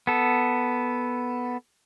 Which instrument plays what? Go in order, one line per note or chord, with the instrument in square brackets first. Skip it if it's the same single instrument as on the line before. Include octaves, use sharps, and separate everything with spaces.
[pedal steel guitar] B3 A4